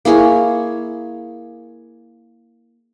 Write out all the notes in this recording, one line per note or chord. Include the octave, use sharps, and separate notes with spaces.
A#3 E4 G#4 C#5